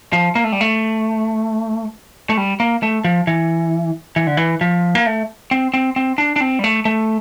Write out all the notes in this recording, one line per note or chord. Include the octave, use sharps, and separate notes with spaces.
F3
A#3
A3
G3
A3
A3
G3
A#3
A3
F3
E3
E3
D3
E3
F3
A#3
A3
C4
C4
C4
D4
D4
C4
G3
A3
A3